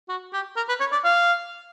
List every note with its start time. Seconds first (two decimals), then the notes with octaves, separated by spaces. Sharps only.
0.09 F#4
0.33 G4
0.57 A#4
0.69 B4
0.80 C#5
0.92 D5
1.04 F5